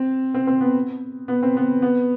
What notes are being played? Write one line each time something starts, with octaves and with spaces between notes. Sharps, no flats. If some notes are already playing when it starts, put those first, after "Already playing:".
Already playing: C4
C4
C4
B3
B3
C4
B3
B3